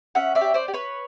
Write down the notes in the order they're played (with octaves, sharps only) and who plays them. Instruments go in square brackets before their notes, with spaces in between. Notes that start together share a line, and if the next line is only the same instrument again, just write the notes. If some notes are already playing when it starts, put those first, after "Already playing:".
[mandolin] C#4 E5 F#5
D5 E5
G4
C5 D5
G4
B4 C#5